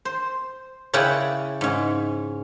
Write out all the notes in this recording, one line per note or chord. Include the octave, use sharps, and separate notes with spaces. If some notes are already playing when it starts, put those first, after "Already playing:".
C5
C#3 C#4 E4 D5 F#5 G5
G#2 C#4